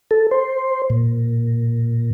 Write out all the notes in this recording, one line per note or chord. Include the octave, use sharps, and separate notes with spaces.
A4
C5
A#2